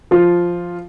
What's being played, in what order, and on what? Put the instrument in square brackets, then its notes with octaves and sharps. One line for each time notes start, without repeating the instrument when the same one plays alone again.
[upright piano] F3 F4